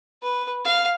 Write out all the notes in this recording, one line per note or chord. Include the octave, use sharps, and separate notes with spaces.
B4
F5